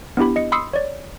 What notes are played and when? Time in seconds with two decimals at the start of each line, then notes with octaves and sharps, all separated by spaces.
0.17 B3 D4 E4 G4 B5
0.36 D#5 C#7
0.52 B5 C6 D#6 E6 C7 C#7
0.73 C#5 D5